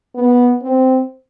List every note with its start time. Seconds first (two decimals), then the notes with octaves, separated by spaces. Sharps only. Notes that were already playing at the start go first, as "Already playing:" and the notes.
0.15 B3
0.62 C4